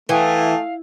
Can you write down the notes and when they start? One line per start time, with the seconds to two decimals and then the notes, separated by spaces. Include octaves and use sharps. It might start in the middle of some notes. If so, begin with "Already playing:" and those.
0.09 E3 A3 F5 G5 G#5 D#6